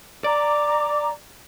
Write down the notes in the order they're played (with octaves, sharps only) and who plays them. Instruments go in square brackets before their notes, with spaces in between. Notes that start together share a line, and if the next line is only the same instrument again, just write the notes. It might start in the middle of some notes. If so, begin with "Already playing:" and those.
[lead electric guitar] D5 [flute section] A#5 D6